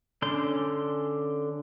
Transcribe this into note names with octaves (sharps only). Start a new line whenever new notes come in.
D3 C#4 D5 C6 G6